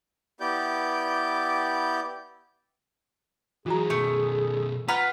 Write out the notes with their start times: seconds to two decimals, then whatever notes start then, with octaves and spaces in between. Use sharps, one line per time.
0.40 B3 E4 G4 D5 D6 G6
3.66 E3 F#3 F4 F#4 G#4 A#5
3.90 B2 D#3 A3
4.88 F4 B4 F#5 A#5 F6